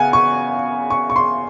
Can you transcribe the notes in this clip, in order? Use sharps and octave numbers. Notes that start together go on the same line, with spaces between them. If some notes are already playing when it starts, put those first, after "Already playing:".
Already playing: C#3 B3 F#5 G#5
C#6
C#6
C#6
C6